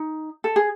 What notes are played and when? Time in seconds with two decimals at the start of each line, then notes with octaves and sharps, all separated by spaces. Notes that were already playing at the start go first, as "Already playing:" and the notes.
Already playing: D#4
0.44 A4
0.56 G#4